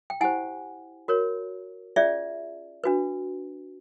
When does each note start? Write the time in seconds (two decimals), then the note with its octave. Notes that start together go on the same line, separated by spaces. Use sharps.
0.10 G5
0.21 E4 G4 C5 F#5 G#5
1.08 F#4 A#4 C#5
1.96 C#4 F4 G#4 D5 E5
2.84 D4 F#4 B4